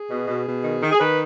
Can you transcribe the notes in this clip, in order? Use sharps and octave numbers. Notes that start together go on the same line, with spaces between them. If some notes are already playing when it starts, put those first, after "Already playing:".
Already playing: G#4
B2
B2
B2
D#3
D#3
G#4
D#3 B4